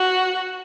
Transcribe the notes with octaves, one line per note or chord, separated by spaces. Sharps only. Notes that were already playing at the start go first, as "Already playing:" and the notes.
Already playing: F#4